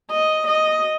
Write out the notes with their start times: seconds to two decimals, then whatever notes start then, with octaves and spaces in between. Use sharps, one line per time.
0.11 D#5
0.47 D#5